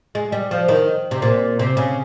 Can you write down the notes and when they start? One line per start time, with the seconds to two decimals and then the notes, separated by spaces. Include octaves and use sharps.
0.15 G#3
0.32 G3
0.51 F3
0.68 D#3
1.11 C3
1.22 A#2
1.59 C3
1.77 C#3